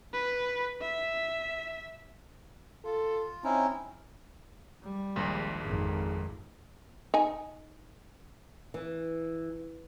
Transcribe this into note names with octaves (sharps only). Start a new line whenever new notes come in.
B4
E5
F4 A4
C4 C#4 D#4 E4
G3
A#1 D#2 G#2
G#1 F2
D#4 G#5
E3